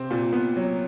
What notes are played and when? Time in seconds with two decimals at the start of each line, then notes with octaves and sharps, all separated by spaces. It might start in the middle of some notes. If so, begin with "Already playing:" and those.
Already playing: C3 C4
0.11 A#2
0.33 B3
0.57 F#3